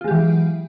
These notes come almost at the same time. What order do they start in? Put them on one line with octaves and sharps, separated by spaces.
F4 G#3 G4 E3 F#3